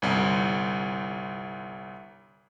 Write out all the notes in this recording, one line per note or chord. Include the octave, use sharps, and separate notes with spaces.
G1 C2